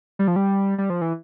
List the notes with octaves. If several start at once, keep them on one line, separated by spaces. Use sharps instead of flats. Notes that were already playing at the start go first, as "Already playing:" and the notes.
G3
F3
G3
G3
F3
E3